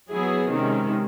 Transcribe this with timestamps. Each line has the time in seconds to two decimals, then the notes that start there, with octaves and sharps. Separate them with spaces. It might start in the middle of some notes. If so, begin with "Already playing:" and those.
0.11 F#3 B3 E4 G#4
0.50 C3 D#3 G#3 C#4